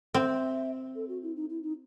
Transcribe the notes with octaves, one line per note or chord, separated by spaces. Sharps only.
C4 E5 F#5
A4
F#4
E4
D#4
E4
D#4